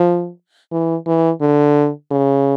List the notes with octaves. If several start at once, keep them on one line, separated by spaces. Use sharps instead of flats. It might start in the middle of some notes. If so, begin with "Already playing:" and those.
Already playing: F3
E3
E3
D3
C#3